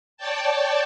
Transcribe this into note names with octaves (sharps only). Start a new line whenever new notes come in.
C#5 D5 G5 A5